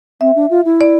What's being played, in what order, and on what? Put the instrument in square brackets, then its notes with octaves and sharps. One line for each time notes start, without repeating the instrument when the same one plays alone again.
[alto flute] C4 [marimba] E5
[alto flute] D4
F4
E4
[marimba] D5